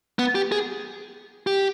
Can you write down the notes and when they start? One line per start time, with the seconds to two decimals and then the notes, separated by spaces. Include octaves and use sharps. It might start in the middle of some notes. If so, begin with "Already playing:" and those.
0.19 B3
0.35 G4
0.52 G#4
1.47 G4